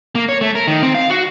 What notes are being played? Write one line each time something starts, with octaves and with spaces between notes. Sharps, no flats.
A#3
C#5
A3
A#4
D#3
C4
F5
F#4